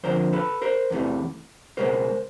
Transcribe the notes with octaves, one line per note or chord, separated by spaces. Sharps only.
F2 D3 F3 A#4 C5
A4 B4
A#4 C5
E2 C3 E3 A3
C#2 B2 G#3 B3 A#4 C5